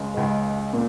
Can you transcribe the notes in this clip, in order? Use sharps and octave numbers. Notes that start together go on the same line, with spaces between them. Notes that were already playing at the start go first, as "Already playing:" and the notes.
Already playing: C#2 C#3 G#3
C#2 C#3 G#3
A#2